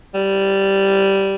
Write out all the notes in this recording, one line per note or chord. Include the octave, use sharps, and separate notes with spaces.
G3